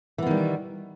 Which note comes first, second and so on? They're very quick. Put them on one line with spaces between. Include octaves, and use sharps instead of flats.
E3 B3 D#3 G3